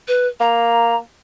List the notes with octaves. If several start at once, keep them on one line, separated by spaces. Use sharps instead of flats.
B4
A#3 A#5